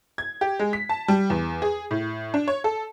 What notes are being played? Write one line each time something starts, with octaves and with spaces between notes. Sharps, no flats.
G#6
G4
G#3
B6
A5
G3
E2
G#4
A2
D4
C#5
A4